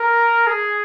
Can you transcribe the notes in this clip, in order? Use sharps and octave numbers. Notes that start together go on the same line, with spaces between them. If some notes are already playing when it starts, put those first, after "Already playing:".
Already playing: A#4
G#4